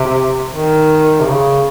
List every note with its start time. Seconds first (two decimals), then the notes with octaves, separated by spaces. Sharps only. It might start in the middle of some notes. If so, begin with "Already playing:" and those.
Already playing: C3
0.53 D#3
1.20 C3
1.27 C#3